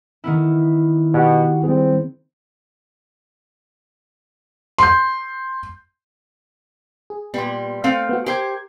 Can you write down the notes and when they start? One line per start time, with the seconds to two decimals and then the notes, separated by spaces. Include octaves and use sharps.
0.24 D#3 B3 E4
1.14 B2 F#4 G4 F#5
1.64 G3 C4 G#4
4.78 C6 G6
7.10 G#4
7.34 A#2 G3 B3 C6
7.84 A3 C4 F5
8.09 B3 F#4
8.26 G4 A#4 C5 G#6